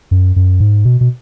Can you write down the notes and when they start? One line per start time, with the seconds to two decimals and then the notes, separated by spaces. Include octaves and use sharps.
0.11 F#2
0.36 F#2
0.60 G#2
0.85 B2
1.01 B2